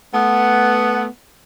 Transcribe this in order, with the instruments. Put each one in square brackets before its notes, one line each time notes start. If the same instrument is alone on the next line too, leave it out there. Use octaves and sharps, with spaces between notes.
[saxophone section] A3 B3